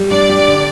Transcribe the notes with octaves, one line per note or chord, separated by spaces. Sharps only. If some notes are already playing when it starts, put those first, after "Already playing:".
Already playing: G3
D4 D5
G4
D3